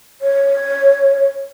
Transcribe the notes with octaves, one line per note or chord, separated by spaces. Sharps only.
C#5